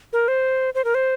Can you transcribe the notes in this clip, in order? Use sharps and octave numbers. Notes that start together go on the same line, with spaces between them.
A#4
C5
C5
A#4
C5